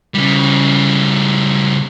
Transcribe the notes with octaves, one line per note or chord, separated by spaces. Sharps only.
C#3 G3